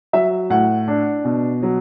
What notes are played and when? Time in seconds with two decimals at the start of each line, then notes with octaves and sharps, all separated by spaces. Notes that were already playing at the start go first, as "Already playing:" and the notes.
0.13 F#3 E5
0.50 A2 F#5
0.88 D4
1.25 B2
1.62 F#3